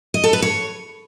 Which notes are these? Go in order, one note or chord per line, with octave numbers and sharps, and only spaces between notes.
D#5
A4
B4
C#5